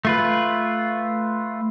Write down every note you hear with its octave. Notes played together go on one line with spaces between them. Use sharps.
A3 F4 B4